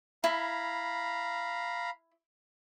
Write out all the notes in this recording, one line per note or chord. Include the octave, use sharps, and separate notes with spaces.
E4 F5 A#5 B5